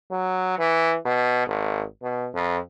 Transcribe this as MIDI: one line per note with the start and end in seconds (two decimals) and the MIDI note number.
0.11 0.56 54
0.59 0.96 52
1.05 1.45 47
1.47 1.83 32
2.03 2.28 47
2.34 2.58 41